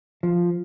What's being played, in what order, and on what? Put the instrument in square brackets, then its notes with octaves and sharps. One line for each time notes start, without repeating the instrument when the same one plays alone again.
[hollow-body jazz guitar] F3